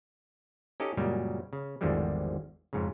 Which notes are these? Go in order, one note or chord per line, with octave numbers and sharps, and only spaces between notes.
C#4 D#4 G4 A4 D#5
F#2 A#2 C#3 G3 G#3
C#3
G#1 E2 D3 F3 G3 G#3
F2 G#2 C#3